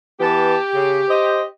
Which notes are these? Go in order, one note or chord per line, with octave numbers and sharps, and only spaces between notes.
E3 B3 G4 A5
C#3
C5 D#5